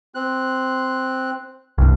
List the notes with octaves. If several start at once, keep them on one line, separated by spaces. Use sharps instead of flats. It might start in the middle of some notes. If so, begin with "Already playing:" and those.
C4 F#6
C2 G2